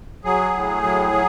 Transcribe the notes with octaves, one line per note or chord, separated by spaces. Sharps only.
F#3 G#4
A2
F#3
F#3